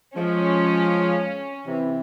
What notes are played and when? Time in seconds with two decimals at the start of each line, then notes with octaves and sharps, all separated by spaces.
0.16 F3 G#3 C#4
1.66 C3 E3